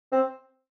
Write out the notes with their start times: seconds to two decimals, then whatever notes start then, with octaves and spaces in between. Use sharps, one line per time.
0.12 C4